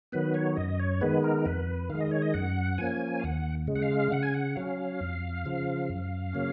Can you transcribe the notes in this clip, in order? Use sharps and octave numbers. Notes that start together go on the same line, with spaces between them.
D#3 F#3 B3 B4
C#5
F#2 D#5
C#5
D#3 G#3 B3 B4
A#4
F2 B4
D#3 G#3 F5
D#5
C#5
D#5
F#2 F#5
F3 A#3 C#4 G#5
F5
D#2 F#5
C#3 G#3
F#5
F5
C#3 F#5
G#5
F#5
F#3 C#4 F5
F2
C#3 F3
F#2
C#3 F#3 A#3 C#4